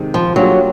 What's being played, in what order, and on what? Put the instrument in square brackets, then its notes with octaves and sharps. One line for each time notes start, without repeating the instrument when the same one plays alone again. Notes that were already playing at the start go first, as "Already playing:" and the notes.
Already playing: [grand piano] C3 D#3 G#3
[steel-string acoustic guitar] F3
[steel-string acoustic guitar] F#3 [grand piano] G3 A#3 D4 F4 G#4